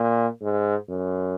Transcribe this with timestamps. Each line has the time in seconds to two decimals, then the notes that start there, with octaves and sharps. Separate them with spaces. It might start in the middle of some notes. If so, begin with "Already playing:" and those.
Already playing: A#2
0.42 G#2
0.89 F#2